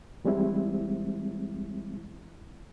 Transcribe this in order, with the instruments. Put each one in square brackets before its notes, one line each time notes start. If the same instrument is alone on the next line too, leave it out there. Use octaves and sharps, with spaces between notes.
[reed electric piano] E3 G3 G#3 C4 E4